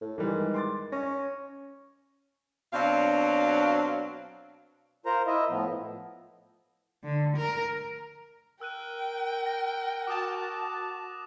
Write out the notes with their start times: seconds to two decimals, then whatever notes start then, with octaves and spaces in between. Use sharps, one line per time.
0.02 A2
0.18 D#3 E3 G3 G#3
0.54 C6 D6 A6
0.92 C#4 C#5 A#6
2.73 B2 F#3 C4 D4 F5
5.06 F4 A#4 C5 A#5
5.27 E4 D#5 E5
5.50 A2 F3 B3
7.04 D3
7.37 A#4
8.61 A#4 G5 E6 F#6 D#7
9.46 F#6 A#6
10.07 F#4 A5 D6 D#6 E7